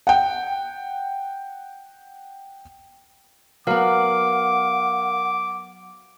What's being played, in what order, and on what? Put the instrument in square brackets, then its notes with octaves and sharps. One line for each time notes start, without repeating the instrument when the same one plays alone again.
[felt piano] F#5 G5
[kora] F#3 B3 [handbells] A#4 F5 [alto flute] F#5 [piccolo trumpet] D6